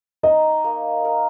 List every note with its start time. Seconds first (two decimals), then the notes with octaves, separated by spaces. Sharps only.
0.23 D#4 D#5
0.64 A#3
1.05 A#4